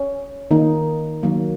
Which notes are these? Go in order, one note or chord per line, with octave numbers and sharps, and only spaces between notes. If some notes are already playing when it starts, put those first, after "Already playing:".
Already playing: C#4
D#3 A#3 D#4
D#3 F#3 A#3